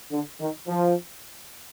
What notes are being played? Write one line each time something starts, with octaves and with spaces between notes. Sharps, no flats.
D3
D#3
F3